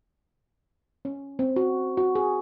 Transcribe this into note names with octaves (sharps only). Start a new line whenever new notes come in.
C#4
C4
F#4
F#4
G#4